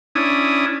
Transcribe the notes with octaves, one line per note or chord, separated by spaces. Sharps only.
C#4 D4 E4 D#6